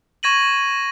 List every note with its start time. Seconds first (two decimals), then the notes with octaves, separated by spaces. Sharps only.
0.23 C#6 G#6 A#6 D#7 F#7